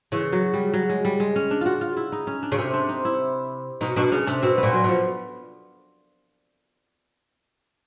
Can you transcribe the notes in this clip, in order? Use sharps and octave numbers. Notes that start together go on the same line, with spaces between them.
C#3 E3
F#3
G3
F#3
G#3
G3
G#3
C#4
D4
F4 F#4
F4
E4
D#4
C#4
D4
C#3
C3 C#4
D4
D#4
E4
B2 D#4
B2 D4
C#3 C#4
C3 D4
B2 C4
B3
A#2
F#3
B2 F3